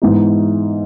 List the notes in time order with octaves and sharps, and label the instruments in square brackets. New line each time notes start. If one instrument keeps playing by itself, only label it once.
[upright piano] G#2 E3 G#3 B3 D#4